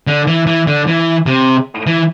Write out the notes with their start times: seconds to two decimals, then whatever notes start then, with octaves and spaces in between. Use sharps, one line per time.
0.07 D3
0.27 E3
0.47 E3
0.67 D3
0.87 E3
1.26 C3
1.87 E3